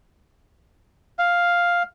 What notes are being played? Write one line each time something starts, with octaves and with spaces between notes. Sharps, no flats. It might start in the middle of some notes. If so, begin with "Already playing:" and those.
F5